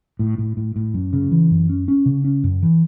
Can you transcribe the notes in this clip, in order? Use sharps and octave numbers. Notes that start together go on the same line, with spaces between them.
A2
A2
A2
A2
F#2
C#3
E3
F#2
C#4
C#4
C#3
C#4
F#2
E3